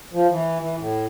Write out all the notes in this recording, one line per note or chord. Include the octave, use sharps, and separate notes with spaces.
F3
E3
E3
A2